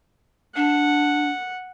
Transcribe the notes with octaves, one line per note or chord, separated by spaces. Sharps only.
D4 F#5